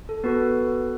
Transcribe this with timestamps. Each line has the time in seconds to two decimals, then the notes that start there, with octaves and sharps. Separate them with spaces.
0.09 A4
0.24 B3 F#4 A4 B4